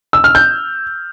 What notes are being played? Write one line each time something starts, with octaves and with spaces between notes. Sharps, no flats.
E6
F6
G6